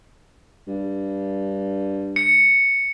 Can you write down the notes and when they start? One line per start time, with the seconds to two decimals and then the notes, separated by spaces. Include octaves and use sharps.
0.67 G2
2.16 C#7